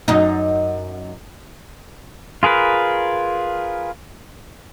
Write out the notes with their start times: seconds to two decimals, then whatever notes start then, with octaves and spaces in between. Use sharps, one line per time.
0.08 F#2 D#4
2.43 F4 G#4 A#4 B4